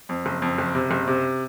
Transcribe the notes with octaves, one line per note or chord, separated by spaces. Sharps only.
F2
F#1
F2
F#1
C3
F#1
C3